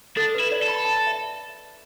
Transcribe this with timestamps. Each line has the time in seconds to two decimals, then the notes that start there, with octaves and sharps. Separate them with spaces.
0.17 D4 A4
0.35 B4
0.40 E4
0.52 D5
0.63 A4
0.68 B5
0.85 A5
1.07 E5